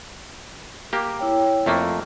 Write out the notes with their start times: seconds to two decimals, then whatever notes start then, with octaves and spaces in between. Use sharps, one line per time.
0.93 A#3 G4
1.19 E4 C#5 G5
1.66 F2 A3 A#3